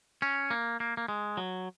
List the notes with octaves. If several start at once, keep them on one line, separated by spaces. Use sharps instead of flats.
C#4
A#3
A#3
A#3
G#3
F#3